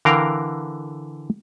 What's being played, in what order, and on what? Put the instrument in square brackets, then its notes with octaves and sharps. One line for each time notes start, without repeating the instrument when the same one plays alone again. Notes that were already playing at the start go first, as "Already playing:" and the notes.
[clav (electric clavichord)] D3 E3 A#4 F5 G5 A#5